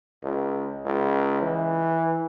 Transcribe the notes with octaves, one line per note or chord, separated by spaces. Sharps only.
C#2
C#2
E3